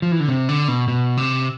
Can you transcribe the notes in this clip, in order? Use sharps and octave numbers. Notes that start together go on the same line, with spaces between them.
F3
E3
D3
C3
D3
B2
B2
C3